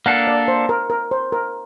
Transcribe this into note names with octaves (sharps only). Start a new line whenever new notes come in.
A#3 D4 A4 F#5
D5
C5
A#4
A#4
C5
A#4